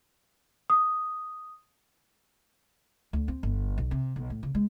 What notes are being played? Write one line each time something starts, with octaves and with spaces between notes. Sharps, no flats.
D#6
D2
C4
G1
B1
C3
B1
A2
C#3
G#3